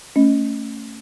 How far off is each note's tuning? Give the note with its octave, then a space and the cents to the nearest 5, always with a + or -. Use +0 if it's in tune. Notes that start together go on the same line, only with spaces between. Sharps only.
A3 +25 C#4 +0 D#5 +0